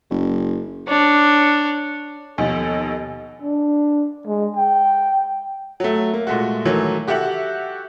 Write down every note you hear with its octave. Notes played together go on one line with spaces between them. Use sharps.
F#1
D4 C#5
D#2 B2 F3 A4 D#5 G#5
D4
G#3
G5
F#3 A3
A#3
A#2 G#3 A3 F#4
D#3 E3 F#3 A3
F#4 G4 A4 E5 F#5 F#6